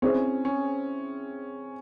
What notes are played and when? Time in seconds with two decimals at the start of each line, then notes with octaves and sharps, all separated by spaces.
0.02 C4 C#4 E4 G#4 C5
0.45 C#4